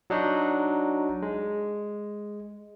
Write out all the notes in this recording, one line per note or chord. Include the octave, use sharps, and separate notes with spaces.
F#3 D4 D#4 F#4
G#3